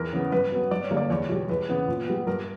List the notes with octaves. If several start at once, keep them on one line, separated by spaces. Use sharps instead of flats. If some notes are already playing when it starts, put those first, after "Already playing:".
Already playing: E2 A#4
C#3 E3 B3
G2 B4
F#3 B3
G2 D5
C#5
D3 G3 A#3
D5
E2 C#5
B2 G3
E2 B4
C#3 E3 B3
A#2
G3 B3
G2 A#4